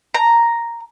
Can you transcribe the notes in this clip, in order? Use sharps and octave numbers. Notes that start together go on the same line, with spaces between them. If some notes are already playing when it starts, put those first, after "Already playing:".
A#5